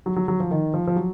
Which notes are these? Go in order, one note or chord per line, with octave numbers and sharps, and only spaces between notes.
F#3
F#3
F#3
F3
D#3
F3
F3
F#3